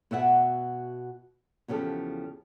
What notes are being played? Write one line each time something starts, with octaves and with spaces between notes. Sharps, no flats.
B2 F#4 E5 F#5 G#5
E2 C#3 F3 G4 A4